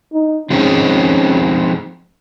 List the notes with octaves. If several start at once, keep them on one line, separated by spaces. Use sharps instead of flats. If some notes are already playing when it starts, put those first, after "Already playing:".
D#4
F3 G#3 C4 C#4 D#4 G#4